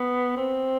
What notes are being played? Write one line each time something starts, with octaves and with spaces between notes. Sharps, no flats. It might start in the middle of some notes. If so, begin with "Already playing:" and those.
Already playing: B3
C4